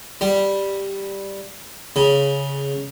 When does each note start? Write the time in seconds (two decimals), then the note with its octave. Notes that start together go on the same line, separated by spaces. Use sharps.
0.21 G3
1.96 C#3